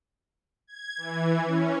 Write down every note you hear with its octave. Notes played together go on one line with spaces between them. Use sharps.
G#6
E3
C#4